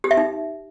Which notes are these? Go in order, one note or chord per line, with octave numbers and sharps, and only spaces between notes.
G4
E5
D#4